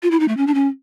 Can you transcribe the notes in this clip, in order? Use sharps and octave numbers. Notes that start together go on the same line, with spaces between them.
F4
E4
D#4
A3
C#4
D4
C#4